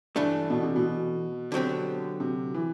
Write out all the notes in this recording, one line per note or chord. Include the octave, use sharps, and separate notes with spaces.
G2 E3 A3 D4
B2
C3
B2
D3 F#3 C4 G4
C3
E3